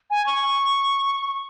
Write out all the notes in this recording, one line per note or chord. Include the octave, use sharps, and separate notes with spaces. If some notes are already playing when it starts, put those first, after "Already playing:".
G#5
C#6